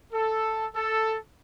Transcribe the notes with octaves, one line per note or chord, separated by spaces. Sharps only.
A4
A4